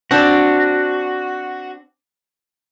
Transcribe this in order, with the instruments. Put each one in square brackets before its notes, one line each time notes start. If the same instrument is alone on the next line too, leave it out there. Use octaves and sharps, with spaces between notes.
[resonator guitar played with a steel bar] C4 D4 [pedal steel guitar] F#4